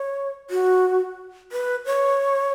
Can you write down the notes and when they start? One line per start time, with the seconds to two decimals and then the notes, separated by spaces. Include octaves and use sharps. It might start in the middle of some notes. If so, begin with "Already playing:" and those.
Already playing: C#5
0.50 F#4
1.52 B4
1.86 C#5